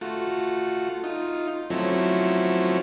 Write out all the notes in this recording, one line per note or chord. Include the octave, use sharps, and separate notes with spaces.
A3 F4 F#4
D#4 F4
F3 F#3 A3 C4 C#4 E4